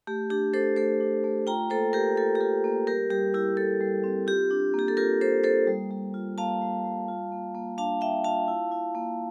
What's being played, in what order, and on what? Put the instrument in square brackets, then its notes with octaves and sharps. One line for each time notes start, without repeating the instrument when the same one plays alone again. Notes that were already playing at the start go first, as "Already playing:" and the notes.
[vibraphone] A3 G4
D4 G4
D4 A4 C5
A3 A4 C5
D4
A3
F4 G5 A#5
A#3 A4 C5
F4 G4 A#4
F4 A4
G4
F4 A4
A#3
G3 G4 A#4
G3 G4
E4 G4
E4 A4
G3
C4
F4 G4
D4
A#3 G4
A4
F4 G4 A#4
D4 A4 C5
A#3 A4 C5
G3
G3
F4
A#3 F5 A5
G3
G3
F4
A#3
A#3
D4 F5 A5
A#3 E5 G5
F4 F5 A5
E4
E4
A#3